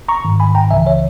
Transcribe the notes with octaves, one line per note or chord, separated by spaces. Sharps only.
A#5 C#6
G#2 D#3
G#5 B5
G5 A#5
C#2 C#3 E3 E5 G#5
C#5 E5